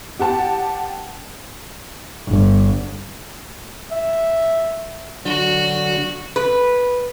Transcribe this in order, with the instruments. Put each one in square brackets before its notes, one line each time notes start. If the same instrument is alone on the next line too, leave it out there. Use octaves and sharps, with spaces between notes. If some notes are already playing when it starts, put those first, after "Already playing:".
[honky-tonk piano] G4 F#5 A5
[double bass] G1
[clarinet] E5
[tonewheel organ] D3 F#3 [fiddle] F#4
[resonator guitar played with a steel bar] B4